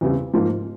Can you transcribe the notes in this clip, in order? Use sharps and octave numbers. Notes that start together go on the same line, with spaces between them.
E2 C#3 G3 C4 E4
G#2 F3 A#3 F4